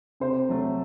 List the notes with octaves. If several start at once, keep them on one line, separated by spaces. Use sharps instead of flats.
C3 C5
F#3 A3